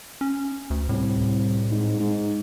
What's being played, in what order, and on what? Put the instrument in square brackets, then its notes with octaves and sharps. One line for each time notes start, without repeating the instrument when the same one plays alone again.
[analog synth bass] C#4
D2
[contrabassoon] C2 [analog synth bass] A2
[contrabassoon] G#2
G#2